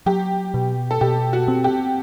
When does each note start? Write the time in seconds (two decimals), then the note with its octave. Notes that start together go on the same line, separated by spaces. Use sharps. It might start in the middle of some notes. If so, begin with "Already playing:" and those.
0.06 F#3 G4
0.54 B2
0.91 A4
1.01 B2 G4
1.33 F#4
1.48 C4
1.64 G4